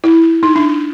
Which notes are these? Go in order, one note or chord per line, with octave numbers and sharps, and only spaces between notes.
E4
D#4
D4